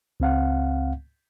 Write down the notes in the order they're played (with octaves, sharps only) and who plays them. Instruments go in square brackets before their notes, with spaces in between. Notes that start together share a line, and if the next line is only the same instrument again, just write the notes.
[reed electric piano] C#2 C4 F5 F#5